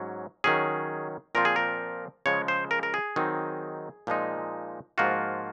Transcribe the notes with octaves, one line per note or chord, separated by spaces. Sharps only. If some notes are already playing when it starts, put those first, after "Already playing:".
Already playing: G#2 F#3 C#4
D#3 F#3 C#4 G#4
A#2 F3 C4 F4 A#4
G#4
A#4
C#3 F3 G#3 C#5
C5
A#4
A#4
G#4
D#3 F#3 C4 D#4
A#2 F3 G#3 D#4
G#2 F3 A#3 F4 F#4